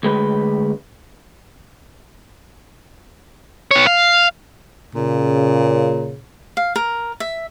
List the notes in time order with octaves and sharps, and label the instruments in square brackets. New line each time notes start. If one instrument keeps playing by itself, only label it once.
[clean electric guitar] D2 G#3 B4
[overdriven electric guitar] B3 C#5
F5
[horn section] A#2 C#3
[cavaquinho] F5
A#4
E5